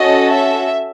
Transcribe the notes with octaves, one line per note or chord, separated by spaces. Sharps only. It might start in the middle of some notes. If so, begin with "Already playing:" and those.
Already playing: C#4 F#4 A4 D#5
E5